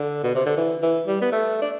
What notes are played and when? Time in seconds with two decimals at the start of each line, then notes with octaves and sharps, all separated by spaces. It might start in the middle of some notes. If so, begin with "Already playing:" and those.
Already playing: D3
0.24 B2
0.35 C3
0.46 D3
0.57 E3
0.82 E3
1.07 G3
1.22 B3
1.32 A3
1.62 D4